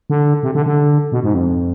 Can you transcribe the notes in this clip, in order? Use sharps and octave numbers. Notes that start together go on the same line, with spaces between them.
D3
C3
D3
D3
B2
G#2
F2